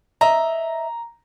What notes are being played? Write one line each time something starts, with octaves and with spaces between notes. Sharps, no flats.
D#5 E5 A#5